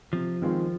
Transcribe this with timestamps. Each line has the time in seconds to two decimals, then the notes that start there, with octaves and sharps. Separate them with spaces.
0.13 C3 F3
0.42 D#3 G#3 C4 F4